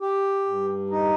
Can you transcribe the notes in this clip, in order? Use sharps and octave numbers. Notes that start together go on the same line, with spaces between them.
G4
G2
D#4